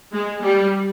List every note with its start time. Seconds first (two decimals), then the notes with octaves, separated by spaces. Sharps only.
0.12 G#3
0.42 G3